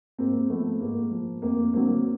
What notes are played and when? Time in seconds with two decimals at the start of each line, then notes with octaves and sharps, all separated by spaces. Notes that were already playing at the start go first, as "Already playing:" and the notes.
0.18 G#2 A#3 C4
0.50 F3 A3 B3
0.80 G#2 A#3
1.11 F3
1.42 F2 A#3
1.73 D3 F#3 A#3 C4